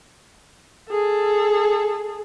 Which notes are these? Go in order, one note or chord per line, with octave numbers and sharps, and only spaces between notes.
G#4 A4